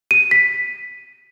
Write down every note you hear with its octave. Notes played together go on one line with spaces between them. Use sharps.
D#7
B6